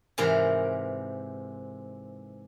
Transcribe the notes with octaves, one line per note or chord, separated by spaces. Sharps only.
G#2 C3 E3 A#4